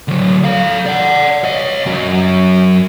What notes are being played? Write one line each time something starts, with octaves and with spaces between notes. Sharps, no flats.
D3 F#3
A4 F5
D5 F#5
C#5 D#5
F#2 F#3